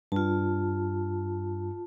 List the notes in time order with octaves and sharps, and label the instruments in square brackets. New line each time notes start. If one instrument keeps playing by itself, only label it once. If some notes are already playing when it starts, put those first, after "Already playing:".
[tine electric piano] G2 [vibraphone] F4 A5